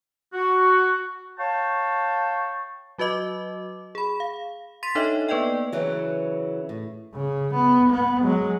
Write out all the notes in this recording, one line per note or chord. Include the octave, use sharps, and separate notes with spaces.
F#4
C#5 F5 G5 A5 C#6
F#3 F#4 B4 D#5 D6
G#4 B5
F5
C6 A6 B6 D#7
D4 D#4 A4 C#5 D#5 E5
A#3 B3 B4 D5 D#5 G5
C#3 E3 F#3
A2
C#3
B3
B3
F#3 G#3